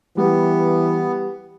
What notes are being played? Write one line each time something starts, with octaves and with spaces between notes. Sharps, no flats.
E3 G3 B3